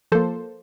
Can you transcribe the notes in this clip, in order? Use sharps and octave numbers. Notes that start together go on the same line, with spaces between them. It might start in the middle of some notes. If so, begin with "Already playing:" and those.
F3 A#3 A4 C5